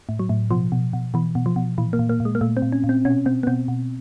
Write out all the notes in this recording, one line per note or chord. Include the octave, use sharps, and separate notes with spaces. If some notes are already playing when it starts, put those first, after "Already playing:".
A2
F#3
A2
B2 F3
B2
B2
B2 E3
B2
F3
B2
A#2 E3
A#3
A#2
A#3
A#2
G#3
A#3
A#2 A3
C4
A#2
C#4
A#2
C4
B2 C#4
B2 C4
B3
B2 C4
B2